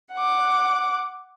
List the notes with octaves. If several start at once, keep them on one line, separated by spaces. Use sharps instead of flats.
F#5 D6